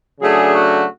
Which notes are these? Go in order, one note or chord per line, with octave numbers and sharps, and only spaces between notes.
C#3 F#3 A3 D4 G#4
F#4